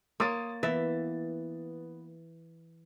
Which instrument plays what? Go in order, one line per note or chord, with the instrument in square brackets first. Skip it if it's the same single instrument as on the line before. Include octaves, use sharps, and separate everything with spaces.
[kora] A#3 C#5 [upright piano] C6 D#6 A6
[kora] E3 E5 [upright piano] B3 A6